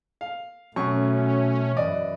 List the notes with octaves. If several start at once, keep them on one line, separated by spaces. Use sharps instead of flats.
F5
F#2 B2 F#3 A3 C#4 C#6
F#2 E3 D5 D#5